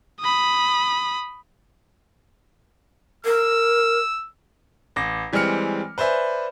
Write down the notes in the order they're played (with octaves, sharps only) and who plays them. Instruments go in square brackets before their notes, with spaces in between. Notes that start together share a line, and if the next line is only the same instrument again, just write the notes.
[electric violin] B5 D#6
[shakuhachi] A#4 [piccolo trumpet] E6
[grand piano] A1 D6 A#6
E3 G3 G#3 C4 F6 C#7
B4 C5 D5 E5 G#5